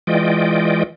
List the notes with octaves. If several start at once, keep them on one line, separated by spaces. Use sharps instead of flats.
E3 G#3 F4 D5 D#5 G5